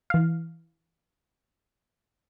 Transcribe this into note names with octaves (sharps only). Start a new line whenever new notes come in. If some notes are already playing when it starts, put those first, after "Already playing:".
E3 F5